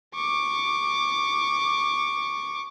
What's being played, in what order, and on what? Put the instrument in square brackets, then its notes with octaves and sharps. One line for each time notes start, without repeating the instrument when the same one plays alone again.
[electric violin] C#6 D6